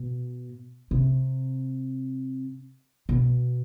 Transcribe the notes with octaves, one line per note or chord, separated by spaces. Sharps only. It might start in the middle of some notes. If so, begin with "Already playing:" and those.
Already playing: B2
C3
B2